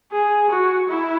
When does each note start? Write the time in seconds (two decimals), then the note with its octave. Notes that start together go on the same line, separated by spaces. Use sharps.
0.12 G#4
0.50 F#4
0.89 E4